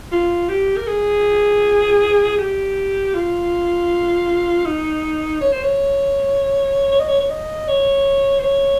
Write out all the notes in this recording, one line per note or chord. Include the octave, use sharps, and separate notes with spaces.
F4
G4
A#4
G#4
G4
F4
D#4
C#5
C5
C#5
C#5
D#5
C#5
C#5
D#5
C#5
C5
C#5